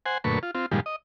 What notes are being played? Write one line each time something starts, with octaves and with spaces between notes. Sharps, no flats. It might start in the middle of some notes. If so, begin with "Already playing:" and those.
C5 F#5 G#5
F#2 A#2 D3 A3 B4 C#6
F4
C4 F4
G2 A#2 D#3 F3 G3 G#3
D#5